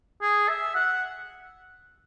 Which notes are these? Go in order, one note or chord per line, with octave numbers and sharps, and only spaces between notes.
G#4
E5
F#5